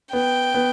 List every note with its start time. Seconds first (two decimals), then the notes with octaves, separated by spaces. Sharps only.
0.13 B3 G5
0.54 B3